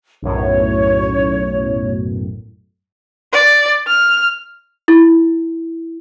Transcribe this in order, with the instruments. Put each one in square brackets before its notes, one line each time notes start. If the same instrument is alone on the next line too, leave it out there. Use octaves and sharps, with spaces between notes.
[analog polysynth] B1 F#2 A2 [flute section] C#5
[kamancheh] D5
F6
[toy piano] E4